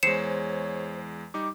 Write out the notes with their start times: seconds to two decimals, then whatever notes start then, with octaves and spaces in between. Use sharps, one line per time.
0.03 E2 G#3 C5 C#5 C7 C#7 E7
1.34 G3 D#4 D6